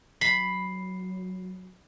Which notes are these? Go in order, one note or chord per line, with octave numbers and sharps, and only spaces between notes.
F#3 B5 C7